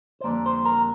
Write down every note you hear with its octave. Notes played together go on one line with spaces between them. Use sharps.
C5
F2 D3 G3 A#3 D5
C5
A#4